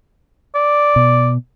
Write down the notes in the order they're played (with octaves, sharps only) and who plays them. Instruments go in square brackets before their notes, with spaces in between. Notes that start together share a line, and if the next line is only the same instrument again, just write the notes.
[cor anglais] D5
[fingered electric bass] B2